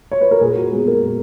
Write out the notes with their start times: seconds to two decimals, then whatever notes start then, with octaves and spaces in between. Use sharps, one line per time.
0.11 C#5
0.21 B4
0.31 A#4
0.41 A#2 G#4
0.56 F#4
0.72 G#3 B3 G#4
0.87 A#4
1.03 A#2